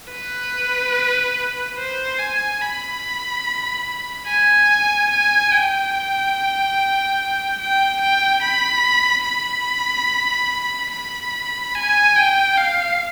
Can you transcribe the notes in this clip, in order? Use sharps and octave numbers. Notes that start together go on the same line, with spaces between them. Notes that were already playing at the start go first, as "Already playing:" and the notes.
B4
C5
G#5
B5
G#5
G#5
G5
G5
G5
B5
B5
B5
G#5
G5
F5